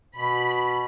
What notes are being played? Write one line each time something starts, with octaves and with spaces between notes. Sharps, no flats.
B2 B5